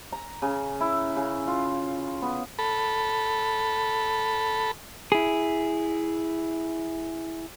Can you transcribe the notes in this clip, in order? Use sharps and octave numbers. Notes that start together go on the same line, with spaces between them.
A#5
C#3
E4
C#3
F4
B3
A4 B5
E4 G#4